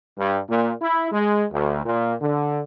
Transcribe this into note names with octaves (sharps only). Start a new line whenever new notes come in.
G2
A#2
E4
G#3
D2
A#2
D3